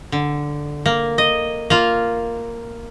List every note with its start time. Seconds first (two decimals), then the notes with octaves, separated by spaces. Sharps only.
0.12 D3
0.86 A#3
1.18 D#5
1.70 A#3 F4